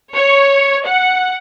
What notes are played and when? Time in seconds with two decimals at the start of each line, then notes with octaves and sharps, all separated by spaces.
0.13 C#5
0.86 F#5